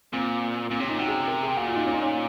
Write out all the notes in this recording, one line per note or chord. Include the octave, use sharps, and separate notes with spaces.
A#2 C4
A#2 C4
C3 C#4
A#2 D#4
C3 F#4
G#4
A#4
G#4
A#2 F#4
F4
D#4
C#4
D#4
C#4